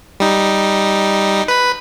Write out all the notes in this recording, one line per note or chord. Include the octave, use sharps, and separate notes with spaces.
G3 D#4
B4 B5